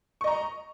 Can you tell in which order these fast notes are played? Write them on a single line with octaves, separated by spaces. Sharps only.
C#6 D#5 A#5